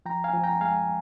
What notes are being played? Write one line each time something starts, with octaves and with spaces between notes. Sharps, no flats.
F3 G5 A#5
F5 G#5
F3
G5 A#5
G#3 F5 G#5